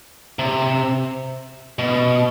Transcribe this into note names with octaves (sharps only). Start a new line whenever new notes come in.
C3
B2